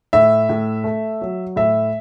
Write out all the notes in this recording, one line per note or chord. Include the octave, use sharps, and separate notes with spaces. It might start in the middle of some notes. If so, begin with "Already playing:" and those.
A2 E5
A2
A3
F#3
A2 E5